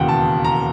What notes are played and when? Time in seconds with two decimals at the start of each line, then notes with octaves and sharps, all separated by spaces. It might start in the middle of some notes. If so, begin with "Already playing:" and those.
Already playing: E1 D#2 C#3 E3 F#5 G5
0.08 A5
0.44 A#5